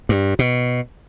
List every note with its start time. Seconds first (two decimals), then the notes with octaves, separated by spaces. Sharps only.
0.09 G2
0.39 B2